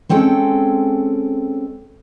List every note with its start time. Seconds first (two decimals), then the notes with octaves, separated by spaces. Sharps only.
0.09 G#3 C4 C#4 A4 G5